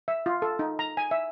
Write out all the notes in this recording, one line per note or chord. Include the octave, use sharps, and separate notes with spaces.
E5
F4
A4
D#4
A#5
G#5
E5